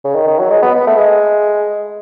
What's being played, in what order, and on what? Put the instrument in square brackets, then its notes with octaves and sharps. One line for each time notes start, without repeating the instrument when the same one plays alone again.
[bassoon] C#3
D#3
D#3
F#3
G#3
B3
B3
A3
G#3